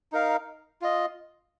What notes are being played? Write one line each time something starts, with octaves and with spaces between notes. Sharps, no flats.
D#4 A#4 F5
F4 D#5